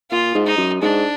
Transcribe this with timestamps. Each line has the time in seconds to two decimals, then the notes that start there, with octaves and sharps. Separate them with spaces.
0.11 A#2 F4
0.35 G#2
0.47 D#4
0.58 F#2
0.82 G#2 D4